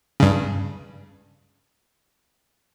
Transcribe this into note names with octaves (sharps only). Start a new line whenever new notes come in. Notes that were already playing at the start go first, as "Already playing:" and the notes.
G2 C#3